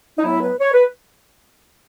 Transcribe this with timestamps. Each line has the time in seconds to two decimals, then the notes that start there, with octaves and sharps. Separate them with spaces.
0.18 D#4
0.23 A2 F#3 B3 E4
0.42 B4
0.60 C#5
0.73 B4